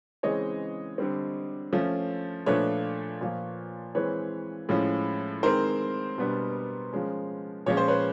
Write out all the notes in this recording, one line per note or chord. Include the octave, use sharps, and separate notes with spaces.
C#3 E3 G#3 C4 C#5 D#5
D3 G3 C4
F3 A3 C#4
A#2 F3 A3 D4 B4 C#5
A#2 F3 A#3
E3 G#3 C4 B4 C#5
A2 F3 G#3 C#4
D#3 G#3 C4 A#4 C5
B2 G3 B3 D4
F3 G#3 C#4
A#2 F3 G#3 C#4 C#5
C5
B4 C#5